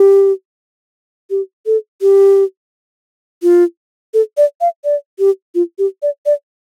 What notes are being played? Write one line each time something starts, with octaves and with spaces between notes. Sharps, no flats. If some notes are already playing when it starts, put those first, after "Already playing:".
Already playing: G4
G4
A4
G4
F4
A4
D5
F5
D5
G4
F4
G4
D5
D5